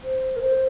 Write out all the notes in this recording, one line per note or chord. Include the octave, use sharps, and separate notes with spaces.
C5
A#4
C5